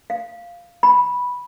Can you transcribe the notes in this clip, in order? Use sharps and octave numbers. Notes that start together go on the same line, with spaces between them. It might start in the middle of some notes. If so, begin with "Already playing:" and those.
F5
B5